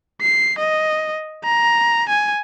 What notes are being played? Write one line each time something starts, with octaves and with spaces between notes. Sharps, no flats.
C7
D#5
A#5
G#5